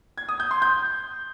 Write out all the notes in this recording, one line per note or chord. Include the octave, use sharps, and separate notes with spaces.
G#6
D#6
G6
C6
G6